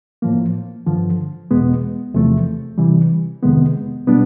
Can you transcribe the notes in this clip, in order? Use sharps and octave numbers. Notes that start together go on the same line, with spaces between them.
A2 F3 A#3
G2 D3 F3
E2 B2 G#3 B3
E2 C3 F3 A3
C3 E3 G3
F2 C3 D#3 G#3 B3
B2 G3 B3 D4